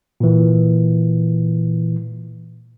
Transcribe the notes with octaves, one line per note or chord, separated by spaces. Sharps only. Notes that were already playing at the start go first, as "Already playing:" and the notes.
A#2 E3